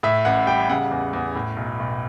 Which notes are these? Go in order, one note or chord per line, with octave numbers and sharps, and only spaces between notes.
A2 E5
A1 F#5
G3 G5
C#3 F#5
E2
E2
A2
B1
B1